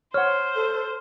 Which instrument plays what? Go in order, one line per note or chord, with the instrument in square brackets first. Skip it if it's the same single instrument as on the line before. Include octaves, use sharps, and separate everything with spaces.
[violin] C5 [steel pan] C#5 F#5 [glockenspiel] F6
[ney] A4